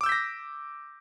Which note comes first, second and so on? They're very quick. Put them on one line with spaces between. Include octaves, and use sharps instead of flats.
D6 E6 G6 B6 A#6